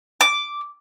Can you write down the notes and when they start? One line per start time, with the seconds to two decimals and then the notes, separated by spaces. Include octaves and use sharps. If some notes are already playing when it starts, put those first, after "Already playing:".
0.21 D6